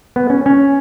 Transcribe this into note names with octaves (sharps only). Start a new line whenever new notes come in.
B3
C#4
C#4